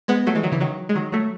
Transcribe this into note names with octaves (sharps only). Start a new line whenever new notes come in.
G#3 B3
F#3 A3
E3 G#3
D#3 F#3
C#3 E3
D#3 F#3
G#3
D#3 F#3
F#3 A3